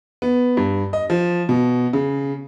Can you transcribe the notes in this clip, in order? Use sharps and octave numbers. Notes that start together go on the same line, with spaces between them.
B3
G2
D#5
F3
B2
C#3